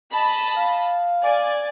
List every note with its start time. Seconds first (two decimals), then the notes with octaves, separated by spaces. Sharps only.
0.13 D#5 A5 B5
0.57 F5
1.23 D5 G#5